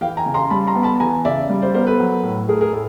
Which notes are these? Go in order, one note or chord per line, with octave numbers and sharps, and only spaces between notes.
E3 F5 G5
G#5 A#5
C#3
A#5 C6
G3 A5 B5
A#5 C6
B3
A5 B5
E3 G#5 A#5
C#3 D5 E5
G3
C5 D5
B3 A#4 C5
A4 B4
F#3
A2
A3 G#4 A#4
G#4 A#4
A2 A4